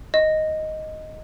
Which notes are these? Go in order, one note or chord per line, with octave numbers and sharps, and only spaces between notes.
D#5